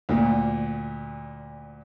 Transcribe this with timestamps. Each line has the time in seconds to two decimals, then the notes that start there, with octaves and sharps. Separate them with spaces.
0.09 D2 A#2